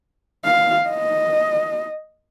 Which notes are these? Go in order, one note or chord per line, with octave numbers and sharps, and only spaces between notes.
F5
D#5